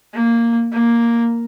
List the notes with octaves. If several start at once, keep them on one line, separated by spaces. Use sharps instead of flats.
A#3
A#3